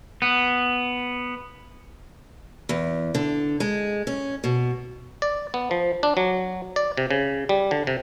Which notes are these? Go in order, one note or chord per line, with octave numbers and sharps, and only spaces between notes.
B3
E2
D3
G#3
C#4
B2
D5
B3
F3
D4
F#3
D5
C3
C#3
G3
D3
C3